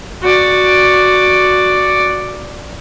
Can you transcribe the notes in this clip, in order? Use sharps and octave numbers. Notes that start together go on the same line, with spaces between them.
F#4 D5